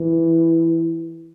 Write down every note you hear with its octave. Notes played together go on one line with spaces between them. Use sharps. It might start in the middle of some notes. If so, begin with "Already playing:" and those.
Already playing: E3